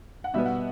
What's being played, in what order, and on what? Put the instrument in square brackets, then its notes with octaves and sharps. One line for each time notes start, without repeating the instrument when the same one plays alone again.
[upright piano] F#5
B2 G3 B3 E5
F#5